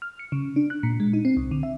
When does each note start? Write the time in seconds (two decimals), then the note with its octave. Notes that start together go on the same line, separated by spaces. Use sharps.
0.02 F6
0.19 C#7
0.32 C#3
0.56 D4
0.70 F#6
0.83 A#2
1.00 G#3
1.13 D#4
1.25 C4
1.37 C2
1.51 D3
1.63 E5